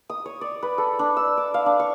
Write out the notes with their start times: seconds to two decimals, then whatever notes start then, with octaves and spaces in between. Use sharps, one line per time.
0.10 D#6
0.25 C#5
0.41 D5
0.62 B4
0.78 A4
0.99 D4
1.17 E6
1.37 D6
1.54 F5
1.66 D4
1.79 C#6